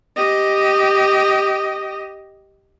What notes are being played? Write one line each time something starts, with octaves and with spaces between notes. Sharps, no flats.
G4 D#5